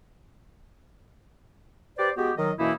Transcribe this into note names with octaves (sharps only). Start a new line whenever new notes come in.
G4 B4 C5 D5
G#3 B3 F#4 G4
D#3 F#3 D#5
F#2 B2 E3 A#3 D#4 E4